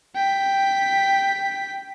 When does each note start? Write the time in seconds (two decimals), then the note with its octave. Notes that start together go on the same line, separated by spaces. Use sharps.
0.15 G5 B6